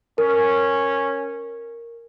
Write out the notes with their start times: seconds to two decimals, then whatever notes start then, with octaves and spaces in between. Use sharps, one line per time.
0.18 C#4 A#4